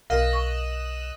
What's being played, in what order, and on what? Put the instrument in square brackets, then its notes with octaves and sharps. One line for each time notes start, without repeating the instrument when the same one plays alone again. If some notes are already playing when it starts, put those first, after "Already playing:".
[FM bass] B1 [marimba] A#4 [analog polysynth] D#5 E6 F#6 [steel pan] F5
[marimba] C#6